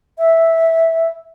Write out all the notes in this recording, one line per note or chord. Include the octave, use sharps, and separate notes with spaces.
E5